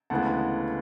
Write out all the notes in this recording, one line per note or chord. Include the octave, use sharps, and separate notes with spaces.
D2 C#3 E3 G#3 B3 F#5 A5